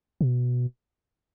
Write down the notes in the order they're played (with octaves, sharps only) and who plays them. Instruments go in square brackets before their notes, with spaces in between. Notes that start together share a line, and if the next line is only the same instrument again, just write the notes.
[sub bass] B2